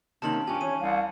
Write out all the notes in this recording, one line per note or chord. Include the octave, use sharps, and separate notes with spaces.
C3 D#3 A#3 C#4 A5 F#7
G2 C#4 F4 G4 G#5
E2 C#5 D#7
C2 F5